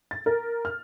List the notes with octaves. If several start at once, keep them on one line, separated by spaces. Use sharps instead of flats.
A6
A#4
F6